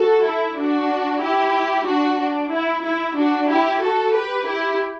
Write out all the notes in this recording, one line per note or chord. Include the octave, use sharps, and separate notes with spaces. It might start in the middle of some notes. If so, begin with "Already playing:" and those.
Already playing: F#4 A4
E4
D4 F#4
E4 G4
D4 F#4
D4
E4
E4
D4 F#4
E4 G4
F#4 A4
G4 B4
E4 G4